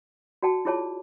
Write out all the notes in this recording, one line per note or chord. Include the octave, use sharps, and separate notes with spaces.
F#4 D5 G5 A5
E4 F4 G#4 C#5 D5 A5